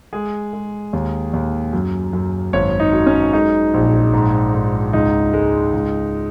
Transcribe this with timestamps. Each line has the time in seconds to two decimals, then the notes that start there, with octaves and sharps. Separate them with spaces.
0.13 G#3 G#4
0.53 G#3
0.93 D#2
1.33 D#2
1.73 F#2
2.13 F#2
2.53 G#1 C#5
2.80 D#4
2.93 F#3
3.06 C#4
3.33 G#3 D#4
3.74 A#1
4.13 G#2
4.54 G#2
4.93 C#2 D#4
5.33 G#3
5.73 C#2